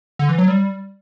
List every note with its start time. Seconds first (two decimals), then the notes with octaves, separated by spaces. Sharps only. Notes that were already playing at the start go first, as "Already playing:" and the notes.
0.19 D3
0.29 E3
0.38 F#3
0.48 G3